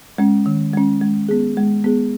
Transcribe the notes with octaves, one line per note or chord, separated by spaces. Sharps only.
G#3 C#4
D#3
G#3 C#4
G#3
B3 G#4
G#3
B3 G#4